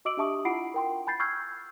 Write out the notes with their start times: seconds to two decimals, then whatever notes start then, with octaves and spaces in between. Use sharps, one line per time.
0.05 F#4 D#5 D6 E6 D7 F#7
0.17 D4 G4 E5 A5 C#6 D#6
0.45 E4 F4 F#5 B5 C7 D7
0.74 A#4 G5 C6
1.07 G#5 B5 G6 A6 C7
1.20 C#6 E6 F6 G6 G#6 C7